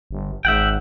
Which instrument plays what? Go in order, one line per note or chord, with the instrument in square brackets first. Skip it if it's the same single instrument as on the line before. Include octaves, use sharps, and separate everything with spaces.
[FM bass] G1
[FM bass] G#1 [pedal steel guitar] E5 F#5 G5